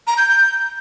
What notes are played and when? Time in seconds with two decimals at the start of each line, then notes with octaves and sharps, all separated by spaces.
0.07 A#5
0.18 G6
0.28 G6